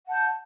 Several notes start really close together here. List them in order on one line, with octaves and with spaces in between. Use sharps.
F#5 A5 G6